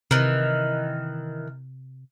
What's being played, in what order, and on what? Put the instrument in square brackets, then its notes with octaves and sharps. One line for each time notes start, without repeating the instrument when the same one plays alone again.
[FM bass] C3 [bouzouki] D#3 E3